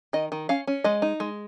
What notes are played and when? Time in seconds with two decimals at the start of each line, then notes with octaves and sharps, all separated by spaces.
0.13 D#3 D#5
0.32 D#3
0.49 C#4 F5
0.67 C#4
0.84 G#3 D#5
1.02 D#4
1.20 G#3